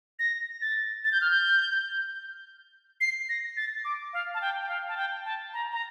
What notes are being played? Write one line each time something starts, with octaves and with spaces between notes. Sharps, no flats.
A#6
A6
A6
G6
F6
G6
C7
A#6
A6
D6
F5
A5
G5
G5
F5
A5
G5
A5
A#5
A#5